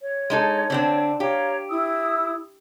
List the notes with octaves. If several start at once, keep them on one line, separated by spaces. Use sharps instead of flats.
C#5
G#3 D#4 A4
D3 C4 D4
G4 C#5 F5 A#5
E4 D#6 E6